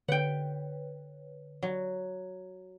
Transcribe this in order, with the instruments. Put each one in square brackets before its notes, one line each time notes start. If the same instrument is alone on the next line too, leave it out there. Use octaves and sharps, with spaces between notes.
[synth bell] D3 B4 C#5 [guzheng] F#5 G5
[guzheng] F#3